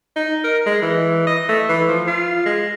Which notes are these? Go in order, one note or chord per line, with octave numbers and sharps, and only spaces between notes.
D#4
A#4
G#3
E3
D#5
A3
E3
F3
F4
G#3